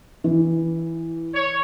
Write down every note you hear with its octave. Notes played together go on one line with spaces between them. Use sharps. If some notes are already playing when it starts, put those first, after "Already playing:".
E3
C#5